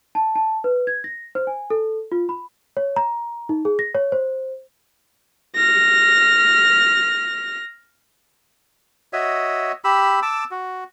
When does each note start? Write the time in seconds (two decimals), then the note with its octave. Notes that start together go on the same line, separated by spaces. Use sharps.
0.15 A5
0.35 A5
0.64 B4
0.87 G#6
1.04 A#6
1.35 C5
1.47 G#5
1.70 A4
2.12 F4
2.29 B5
2.77 C#5
2.96 A#5
3.49 D#4
3.65 G#4
3.79 A#6
3.95 C#5
4.12 C5
5.56 F6 A#6
9.13 F#4 C#5 D#5 E5
9.84 G4 B5 E6
10.22 A5 D6 E6
10.51 F#4